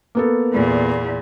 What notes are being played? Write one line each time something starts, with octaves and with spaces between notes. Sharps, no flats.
A#3 B3 A4
E2 A#2